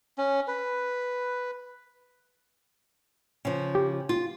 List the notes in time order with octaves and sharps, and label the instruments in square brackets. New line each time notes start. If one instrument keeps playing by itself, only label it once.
[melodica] C#4
B4
[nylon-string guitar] C#3 F3
[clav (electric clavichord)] G4
[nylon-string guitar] F4